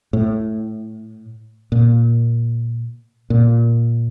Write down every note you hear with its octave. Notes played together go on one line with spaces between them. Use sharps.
A2
A#2
A#2